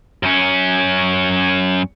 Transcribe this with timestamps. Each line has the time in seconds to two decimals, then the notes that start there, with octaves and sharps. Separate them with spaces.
0.23 F#2 C#4